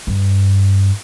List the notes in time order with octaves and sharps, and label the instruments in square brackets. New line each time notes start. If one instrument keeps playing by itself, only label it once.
[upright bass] G2